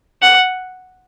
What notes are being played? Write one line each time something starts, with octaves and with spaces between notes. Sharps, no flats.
F#5